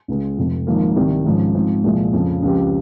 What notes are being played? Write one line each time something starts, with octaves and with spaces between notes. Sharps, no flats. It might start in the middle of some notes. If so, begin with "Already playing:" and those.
C#2 C#3 G#3
F1 F2 C3
G#1 G#2 F3 A#3
C2 C3 D#3 G3
G#1 G#2 F3 G#3 C#4
G#2 F3 C4
C2 A#2 F3 G#3
F2 C#3 F3
C#2 C#3 F3 C4 G4